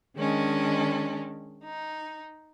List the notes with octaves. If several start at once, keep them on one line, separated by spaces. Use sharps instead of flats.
D#3 G#3 C#4 D4
D#4